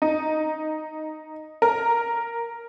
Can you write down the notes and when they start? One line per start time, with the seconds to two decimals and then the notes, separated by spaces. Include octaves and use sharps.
0.02 D#4
1.62 A#4